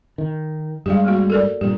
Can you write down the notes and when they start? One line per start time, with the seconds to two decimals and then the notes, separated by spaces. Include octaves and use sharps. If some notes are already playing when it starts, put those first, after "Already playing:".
0.18 D#3
0.86 G2 G3 G#3 G4 F5
1.04 A3 A#3 F#4
1.30 A4 A#4 D5
1.61 G2 A#2 G4